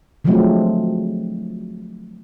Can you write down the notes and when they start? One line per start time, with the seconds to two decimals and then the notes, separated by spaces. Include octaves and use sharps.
0.25 D3 F3 F#3 G#3 A3 C4